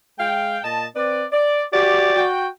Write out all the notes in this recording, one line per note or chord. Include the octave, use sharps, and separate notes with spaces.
G#3 F5 G5
A#2 D#5 A5
C4 B4 D5
D5
F#4 G4 D5
F#4 G5